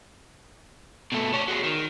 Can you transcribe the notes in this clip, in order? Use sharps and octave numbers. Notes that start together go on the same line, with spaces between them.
B2 A3
C#4 D4
F#3 G#3
D#3